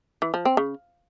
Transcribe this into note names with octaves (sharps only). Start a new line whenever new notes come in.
E3
F3
C4
C#3